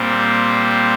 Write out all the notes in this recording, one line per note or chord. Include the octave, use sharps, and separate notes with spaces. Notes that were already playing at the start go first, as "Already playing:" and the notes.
Already playing: A#2 G3 C4